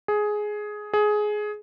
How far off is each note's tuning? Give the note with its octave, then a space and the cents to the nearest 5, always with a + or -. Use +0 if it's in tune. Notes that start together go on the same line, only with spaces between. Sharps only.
G#4 +10
G#4 +15